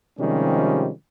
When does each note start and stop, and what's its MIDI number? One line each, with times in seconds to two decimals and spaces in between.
0.18 0.90 48
0.18 0.90 51
0.18 0.90 53
0.18 0.90 55
0.18 0.90 56
0.18 0.90 61